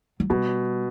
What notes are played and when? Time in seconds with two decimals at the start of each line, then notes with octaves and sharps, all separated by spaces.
0.20 F#3
0.30 B2 G3